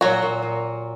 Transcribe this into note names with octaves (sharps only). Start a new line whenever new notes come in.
A#2 F#3 F#4
A#2
A#2